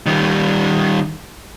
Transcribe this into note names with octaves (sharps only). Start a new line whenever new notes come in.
D#3 G3